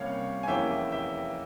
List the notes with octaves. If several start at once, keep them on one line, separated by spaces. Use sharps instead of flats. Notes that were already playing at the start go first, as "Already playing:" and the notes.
Already playing: C2 C3 G3 A#3 C#4 C#5 F5
G#5
F1 E2 E3 A#3 C#4 E5 G5
E5 G5